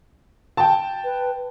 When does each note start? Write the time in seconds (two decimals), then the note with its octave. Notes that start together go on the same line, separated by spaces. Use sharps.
0.57 G5 A5
1.04 B4